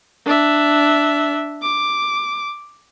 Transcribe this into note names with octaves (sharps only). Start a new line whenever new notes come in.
D4 E5
D6